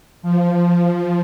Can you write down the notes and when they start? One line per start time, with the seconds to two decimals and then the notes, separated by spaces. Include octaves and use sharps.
0.22 F3